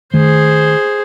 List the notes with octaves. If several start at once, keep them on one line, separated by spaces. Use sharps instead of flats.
D#3 A3 G#4 C5